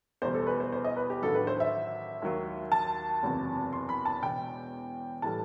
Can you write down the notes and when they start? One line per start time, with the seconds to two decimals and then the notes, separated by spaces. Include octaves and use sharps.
0.22 E2 B2 G3 C5
0.34 A4
0.47 B4
0.60 C5
0.72 C5
0.85 D#5
0.97 B4
1.10 G4
1.22 A1 G2 D#3 F#3 A4
1.34 B4
1.47 C5
1.60 E5
2.22 D#2 D#3 F#3
2.72 A5
3.22 F#1 E2 C3 F#3
3.73 C6
3.89 B5
4.05 A5
4.22 E1 E2 B2 G5
5.22 A2 E3 G3 A5